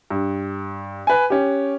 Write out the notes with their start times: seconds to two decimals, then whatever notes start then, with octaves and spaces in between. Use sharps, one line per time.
0.10 G2
1.07 B4 G#5
1.30 C#4 G4